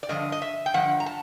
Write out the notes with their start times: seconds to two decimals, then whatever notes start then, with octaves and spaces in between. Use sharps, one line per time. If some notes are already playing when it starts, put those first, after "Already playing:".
0.03 D5
0.09 G2 D3 F3 D#5
0.32 D#5
0.42 E5
0.66 G5
0.74 G2 D3 F3 F#5
1.00 A#5
1.06 A5